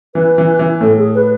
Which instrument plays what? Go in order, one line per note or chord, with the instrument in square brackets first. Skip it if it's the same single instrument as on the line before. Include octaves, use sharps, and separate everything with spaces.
[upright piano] E3 [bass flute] B4
[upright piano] E3
E3
[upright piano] A2 [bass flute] A4
[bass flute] G#4
B4